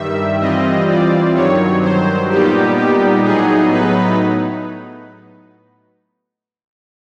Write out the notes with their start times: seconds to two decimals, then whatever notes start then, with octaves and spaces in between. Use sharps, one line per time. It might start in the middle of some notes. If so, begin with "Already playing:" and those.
Already playing: G2 D#3 G3 E5
0.40 E3 G3 C4 F4 D#5
0.87 D5
1.34 G2 D#3 F#3 C#5
1.81 C5
2.29 A#2 G3 B3 D#4 G4
2.76 G4
3.23 A2 F#3 B3 D#4 G#4
3.71 B4